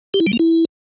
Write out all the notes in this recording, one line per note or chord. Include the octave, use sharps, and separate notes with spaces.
G4
E4
G3
A#3
E4